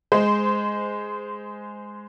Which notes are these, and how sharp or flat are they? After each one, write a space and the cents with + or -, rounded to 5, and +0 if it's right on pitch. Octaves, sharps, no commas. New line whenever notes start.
G#3 +0 C5 -20